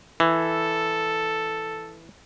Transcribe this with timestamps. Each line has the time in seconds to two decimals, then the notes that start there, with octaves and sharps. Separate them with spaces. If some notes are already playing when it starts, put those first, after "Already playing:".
0.20 E3 A4